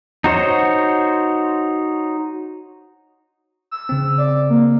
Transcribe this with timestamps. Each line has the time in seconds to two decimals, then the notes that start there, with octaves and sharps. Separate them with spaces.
0.24 D#4 F#4 C5 C#5
3.71 E6
3.89 C#3 C4
4.18 D5
4.50 A#3